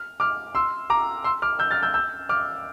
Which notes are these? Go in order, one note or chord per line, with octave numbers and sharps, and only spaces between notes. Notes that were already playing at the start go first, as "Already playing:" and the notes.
Already playing: F6
D6 F6
C6 E6
A#5 D6
C6 E6
D6 F6
E6 G6
F6 A6
E6 G6
E6 G6
D6 F6